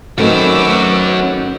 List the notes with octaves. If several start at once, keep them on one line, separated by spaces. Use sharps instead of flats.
D#3 A3 C4 C#4 F#4 B4 D6 E6